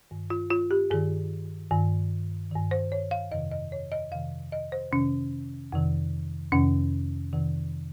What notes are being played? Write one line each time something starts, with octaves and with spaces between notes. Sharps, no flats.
G2 D#3
F4
F4
G4
G2 D#3 G#4
G2 D#3
G2 D#3
C5
C#5
F5
F2 C3 D#3 D#5
D#5
C#5
D#5
F2 C3 D#3 F5
D#5
C5
F2 C3 D#3 C#4
F2 C3 D#3
F2 C3 D#3 C#4
F2 C3 D#3